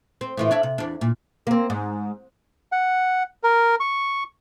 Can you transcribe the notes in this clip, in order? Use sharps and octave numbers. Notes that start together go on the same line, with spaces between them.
C4
A2 E3 F4
D4 C#5 E5
C3
E2 D4
A#2
A#3 C4
G#2
F#5
A#4
C#6